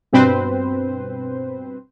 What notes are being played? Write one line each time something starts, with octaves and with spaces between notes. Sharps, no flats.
G2 B2 C4 B4 C5